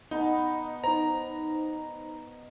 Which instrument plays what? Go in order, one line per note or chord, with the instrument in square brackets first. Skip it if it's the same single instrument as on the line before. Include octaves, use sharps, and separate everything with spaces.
[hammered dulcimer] B2 B3 [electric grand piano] D#4
[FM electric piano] D#4 C5 [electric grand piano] A#5